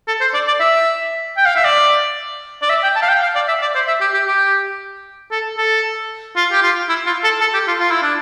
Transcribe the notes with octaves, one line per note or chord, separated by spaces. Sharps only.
A4
C5
D5
D5
E5
G5
F5
E5
D5
D5
E5
G5
A5
F5
G5
F5
D5
E5
D5
C5
E5
G4
G4
G4
A4
A4
F4
G4
F4
E4
F4
A4
A4
G4
F4
F4
E4
D4